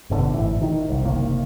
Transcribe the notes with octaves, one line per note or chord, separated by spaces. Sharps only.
G1 B2 D3
G#1 A2 E3
D#3
C2
F#1 C3 D#3 A#3